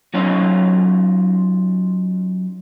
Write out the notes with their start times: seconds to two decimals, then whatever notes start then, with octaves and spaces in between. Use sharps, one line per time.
0.14 F#3 C#4 D#4 F4 C#5 D#5